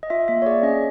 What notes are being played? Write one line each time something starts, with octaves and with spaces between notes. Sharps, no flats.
D#5
F4 E5
A#3 E5
C#5
G#4 D5
C#4 D#5